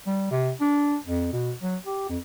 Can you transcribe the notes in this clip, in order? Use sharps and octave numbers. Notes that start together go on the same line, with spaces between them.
G3
C3
D4
F2
B2
F#3
G4
F2